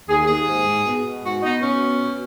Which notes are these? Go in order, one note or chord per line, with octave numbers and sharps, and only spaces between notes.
D#2 G#4
D#2 G#4
G#2
G#2
B2
B2
G#2 F#4
B3 D#4
B2 C#4
B3
B2